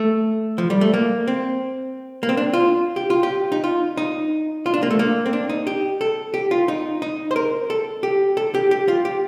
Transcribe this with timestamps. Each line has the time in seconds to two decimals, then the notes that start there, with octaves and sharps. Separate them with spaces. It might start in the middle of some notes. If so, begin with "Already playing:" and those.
Already playing: A3
0.58 F3
0.70 G3
0.81 A3
0.94 A#3
1.28 C4
2.23 A#3
2.29 C4
2.37 D4
2.53 F4
2.96 G4
3.10 F4
3.23 G4
3.52 D#4
3.64 F4
3.97 D#4
4.66 F4
4.74 D4
4.83 A#3
4.90 A3
4.99 A#3
5.26 C4
5.33 D4
5.49 D#4
5.67 G4
6.01 A4
6.34 G4
6.51 F4
6.68 D#4
7.02 D#4
7.31 C5
7.36 A#4
7.70 A4
8.03 G4
8.37 A4
8.55 G4
8.71 G4
8.88 F4
9.05 G4